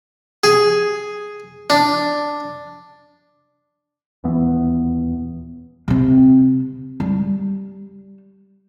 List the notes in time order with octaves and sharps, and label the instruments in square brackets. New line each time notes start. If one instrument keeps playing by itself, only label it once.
[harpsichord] G#4
D4
[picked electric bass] D#1 E2 E3 B3
[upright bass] C3 C4
G3